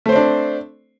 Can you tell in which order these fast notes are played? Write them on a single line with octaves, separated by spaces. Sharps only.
A3 C5 C4 D4